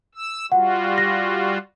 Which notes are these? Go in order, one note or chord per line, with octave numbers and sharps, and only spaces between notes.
E6
G3 F4 F#4 F#5
A#6